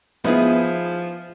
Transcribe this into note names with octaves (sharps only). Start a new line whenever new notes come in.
F3 B3 D#4 E4 G#4